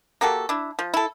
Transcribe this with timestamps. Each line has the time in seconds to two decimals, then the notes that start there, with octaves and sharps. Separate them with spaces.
0.21 A#3 F#4 G4 A4
0.49 D4 E4
0.79 F3
0.94 E4 A4